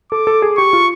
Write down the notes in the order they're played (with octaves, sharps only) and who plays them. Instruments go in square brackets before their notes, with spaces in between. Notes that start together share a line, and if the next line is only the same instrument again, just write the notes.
[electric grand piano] A4 [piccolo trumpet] D6
[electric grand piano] A4
G#4
[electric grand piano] G4 [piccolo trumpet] C#6
[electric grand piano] F4